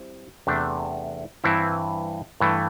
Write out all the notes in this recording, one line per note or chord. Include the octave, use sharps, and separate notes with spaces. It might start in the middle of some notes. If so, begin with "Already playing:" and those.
Already playing: G3 C4 E4
E2 C3 A3 D4
G2 E3 C4 E4
G2 E3 A3